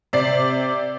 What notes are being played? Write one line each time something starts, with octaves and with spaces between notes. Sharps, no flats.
C3 D5 C7